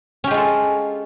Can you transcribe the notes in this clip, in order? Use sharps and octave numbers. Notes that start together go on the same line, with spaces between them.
G#3 C#4 F4 G4 A4